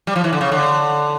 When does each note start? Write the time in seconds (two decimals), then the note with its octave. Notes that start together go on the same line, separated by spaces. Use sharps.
0.07 G3
0.16 F3
0.24 E3
0.33 D3
0.41 C#3
0.52 D3